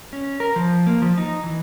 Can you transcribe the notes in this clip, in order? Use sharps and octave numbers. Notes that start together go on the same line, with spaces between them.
C#4
A#4
F3
A#3
F3
D#4
E3